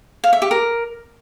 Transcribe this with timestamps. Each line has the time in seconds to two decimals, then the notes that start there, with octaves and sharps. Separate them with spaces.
0.24 F5
0.33 E5
0.42 G4
0.51 A#4